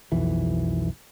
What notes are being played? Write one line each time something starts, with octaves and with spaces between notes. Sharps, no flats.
B1 F2 E3